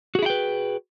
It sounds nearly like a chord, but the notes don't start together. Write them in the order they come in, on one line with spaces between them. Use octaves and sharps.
F#4 G#4 E4 G5 B4